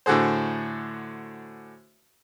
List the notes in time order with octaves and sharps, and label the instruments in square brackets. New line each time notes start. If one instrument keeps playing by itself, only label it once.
[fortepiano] A2 D3 F#4 G#4 C5